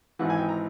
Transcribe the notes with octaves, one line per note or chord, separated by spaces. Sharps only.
G#1 G#2 E3 F#5
G#5
G5
A#5